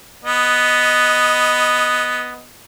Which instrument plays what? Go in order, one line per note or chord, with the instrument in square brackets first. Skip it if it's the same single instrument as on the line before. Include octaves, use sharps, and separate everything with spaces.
[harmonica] B3 D#5